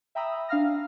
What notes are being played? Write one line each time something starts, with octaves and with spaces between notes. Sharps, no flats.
E5 G5 A#5 B5 D#6 E6
D4 F5 F6 A#6